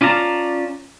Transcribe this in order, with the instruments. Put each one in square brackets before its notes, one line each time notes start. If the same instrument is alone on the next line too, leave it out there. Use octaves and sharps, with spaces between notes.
[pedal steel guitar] C#4 F4 D5 A5 A#5